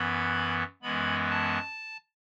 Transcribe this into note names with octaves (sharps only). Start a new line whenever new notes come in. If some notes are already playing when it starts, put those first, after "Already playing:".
Already playing: F#2 E3 B3 B5
F#2 E3 G#3 B3 B5
A5